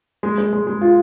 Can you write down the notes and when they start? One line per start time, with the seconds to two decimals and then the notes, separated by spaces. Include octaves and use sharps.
0.23 G#3
0.38 G#3
0.53 G#3
0.67 G#3
0.81 F4